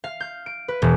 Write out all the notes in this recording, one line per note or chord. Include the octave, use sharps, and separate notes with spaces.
F5
G6
D7
B4
E1